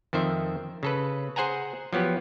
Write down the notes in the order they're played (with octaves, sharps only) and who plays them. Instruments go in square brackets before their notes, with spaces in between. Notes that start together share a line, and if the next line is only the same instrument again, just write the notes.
[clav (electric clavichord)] F2 D#3 C5 E5
C#3 A4 B4
G#4 C5 F#5 G#5 A#5
F3 F#3 B3 G4